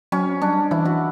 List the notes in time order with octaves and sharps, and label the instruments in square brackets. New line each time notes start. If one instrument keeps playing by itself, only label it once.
[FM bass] F#3 [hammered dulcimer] C#4
[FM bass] G3 [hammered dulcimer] D4
[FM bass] E3 [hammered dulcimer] E4
[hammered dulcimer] F#4